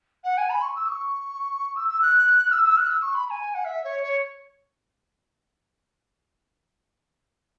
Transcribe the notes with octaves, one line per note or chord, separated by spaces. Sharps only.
F#5
G#5
B5
C#6
E6
C#6
E6
E6
F#6
E6
E6
F#6
E6
C#6
B5
B5
G#5
F#5
E5
C#5
C#5